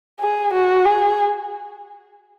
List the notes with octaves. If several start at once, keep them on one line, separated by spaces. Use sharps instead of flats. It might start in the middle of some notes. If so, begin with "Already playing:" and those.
G#4
F#4
G#4